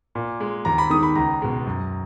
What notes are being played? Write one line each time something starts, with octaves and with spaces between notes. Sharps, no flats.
A#2
G#3
D#2 A#5
B5
D#3 G#3 D#6
B5
C#2 A#5
B2 G#3
F#2